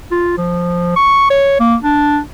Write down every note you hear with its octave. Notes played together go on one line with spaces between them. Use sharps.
F4
F3
C#6
C#5
A#3
D4